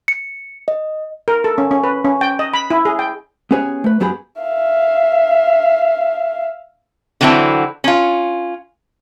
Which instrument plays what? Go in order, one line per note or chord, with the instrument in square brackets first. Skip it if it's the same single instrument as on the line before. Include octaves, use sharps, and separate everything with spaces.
[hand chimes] C#7
D#5
[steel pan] A#4
A4
C#4
C#4
B4
C#4
G5
D#5
B5
E4
G#4
G5
[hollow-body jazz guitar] B3 C#4 G4 G#4 B4 C#5
A3 B4
F#2 F#3 B3 G4 G#4 B5
[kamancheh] E5 F5
[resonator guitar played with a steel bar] D3 E3 F#3 C4 E4
C#4 F4